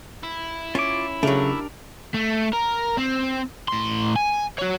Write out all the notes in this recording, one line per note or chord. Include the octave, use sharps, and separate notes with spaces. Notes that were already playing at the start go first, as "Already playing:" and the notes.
E4
C#4 F4 D6
C#3 F#3 A3 D4 G4 A#4
A3
A#4
C4
A2 C6
G#5
F#4 C#5